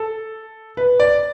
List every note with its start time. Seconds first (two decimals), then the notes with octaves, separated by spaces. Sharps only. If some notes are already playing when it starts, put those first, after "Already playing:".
Already playing: A4
0.77 B4
1.00 D5